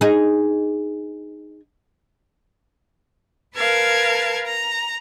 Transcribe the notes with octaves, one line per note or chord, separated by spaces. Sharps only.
D#4 G#4
A#4 B4 F5 A5 G#6
A#5